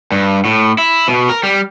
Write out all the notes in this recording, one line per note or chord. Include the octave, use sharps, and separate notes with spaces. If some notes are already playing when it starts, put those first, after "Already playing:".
G2
A2
E4
B2
A#4
G3